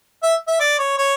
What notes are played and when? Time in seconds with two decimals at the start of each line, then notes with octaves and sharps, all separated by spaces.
0.23 E5
0.48 E5
0.60 D5
0.79 C#5
0.98 C#5